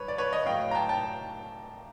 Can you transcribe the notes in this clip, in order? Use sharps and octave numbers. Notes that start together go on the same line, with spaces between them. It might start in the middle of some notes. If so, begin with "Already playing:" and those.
Already playing: G2 B4 C#5
D5
B4 C#5
C#5 D#5
A2 F#3 F5 G5
A#5
G5 A5
G5 A5